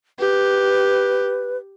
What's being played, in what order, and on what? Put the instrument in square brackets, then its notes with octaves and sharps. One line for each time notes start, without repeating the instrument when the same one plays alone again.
[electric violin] G4 [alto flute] B4